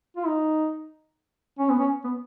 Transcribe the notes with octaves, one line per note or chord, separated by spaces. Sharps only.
F4
D#4
C#4
B3
C#4
B3